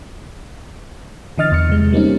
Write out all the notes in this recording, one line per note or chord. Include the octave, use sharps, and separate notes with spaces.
D3 E3 D#5 F6 A6
E2 F6 C#7
C3 G#3
G3 A#3 C4 C#4 D#4